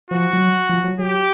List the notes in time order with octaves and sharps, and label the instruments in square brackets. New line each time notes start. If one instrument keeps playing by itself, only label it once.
[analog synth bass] F3 [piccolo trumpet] F#4
[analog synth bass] F#3
F3
F#3
[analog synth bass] F#3 [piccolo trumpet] G4